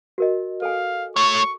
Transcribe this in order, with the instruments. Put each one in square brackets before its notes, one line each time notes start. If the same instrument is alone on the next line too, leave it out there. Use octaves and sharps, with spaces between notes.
[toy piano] F#4 A#4 D#5
[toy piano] A4 G#5 [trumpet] F5
[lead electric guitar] A3 C#5 [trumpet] C#6